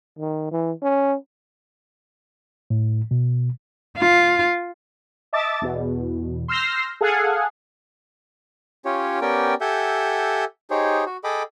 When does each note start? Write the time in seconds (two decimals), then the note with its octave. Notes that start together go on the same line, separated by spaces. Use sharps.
0.19 D#3
0.51 E3
0.82 C#4
2.70 A2
3.11 B2
3.98 F4
5.33 D#5 E5 A5 D6 A6
5.62 E2 B2
6.48 C6 E6 F6 G6 A#6 C7
7.01 G#4 A4 F5 F#5 G#5
8.85 C#4 F4 G4 C#5
9.21 B3 C#4 G4 A#4 D5 G5
9.61 G4 A4 E5 F#5 G#5 G6
10.71 D#4 G4 G#4 C5 C#5
11.06 F#4
11.24 G#4 A4 D#5 G5 B5 D6